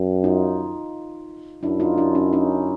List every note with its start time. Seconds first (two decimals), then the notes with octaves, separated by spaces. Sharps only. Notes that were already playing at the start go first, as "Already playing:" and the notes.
Already playing: F#2
0.24 D#4 F4
1.63 F#2 D4 E4
1.80 D#4 F4
1.97 D4 E4
2.15 C#4 D#4
2.33 C#4 D#4